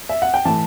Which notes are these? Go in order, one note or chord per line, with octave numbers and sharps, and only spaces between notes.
E5
F#5
G5
A2 E3 A5